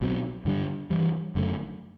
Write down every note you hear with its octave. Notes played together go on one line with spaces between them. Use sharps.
B1 B2 F#3 C4
G2 D3 G3 D4
G2 E3 G3
F#1 F#2 D3 A3